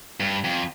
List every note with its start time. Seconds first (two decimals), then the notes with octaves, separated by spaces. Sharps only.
0.20 G2
0.44 F2